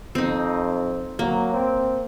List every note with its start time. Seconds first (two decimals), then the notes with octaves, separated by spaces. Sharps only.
0.15 F2 C4 D#4
1.19 F#3 A#3
1.53 C4